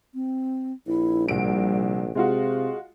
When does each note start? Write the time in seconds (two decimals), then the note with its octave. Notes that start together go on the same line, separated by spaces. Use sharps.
0.14 C4
0.87 A#1 E4
1.28 C2 G3 D7
2.15 C3 G#3 F4 F#4 G#4